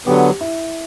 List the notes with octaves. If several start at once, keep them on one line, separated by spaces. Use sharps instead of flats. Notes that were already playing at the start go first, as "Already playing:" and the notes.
D3 F#3 B3 G4
E4